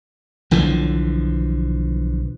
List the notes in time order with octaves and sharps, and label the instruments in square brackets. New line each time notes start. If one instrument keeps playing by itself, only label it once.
[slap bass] B1 D3 E3 F3